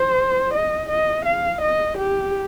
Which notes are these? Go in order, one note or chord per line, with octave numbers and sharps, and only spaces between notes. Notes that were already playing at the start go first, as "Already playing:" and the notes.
Already playing: C5
D#5
D#5
F5
D#5
G4